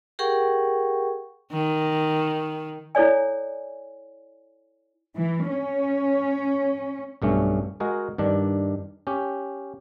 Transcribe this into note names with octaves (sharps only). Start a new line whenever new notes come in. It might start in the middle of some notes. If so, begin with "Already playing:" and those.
G4 G#4 A#4 F#5 G5 C#6
D#3
E4 A4 C#5 D5 G#5
E3
C#4
B1 G2 A3 C#4
G#3 F#4 G#4 A#4
G2 D#3 D4
C#4 G4